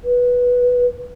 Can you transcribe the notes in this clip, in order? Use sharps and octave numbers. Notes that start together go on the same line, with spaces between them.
B4